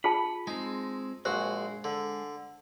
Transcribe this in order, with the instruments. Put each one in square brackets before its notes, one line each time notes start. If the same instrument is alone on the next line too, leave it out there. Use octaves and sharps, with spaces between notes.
[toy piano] F4 G#4 A5 [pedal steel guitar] B5
[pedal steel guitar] G#3 C4 [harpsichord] D#4
[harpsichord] A#1 F#4 [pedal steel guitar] G#3 [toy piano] C5
[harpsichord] D3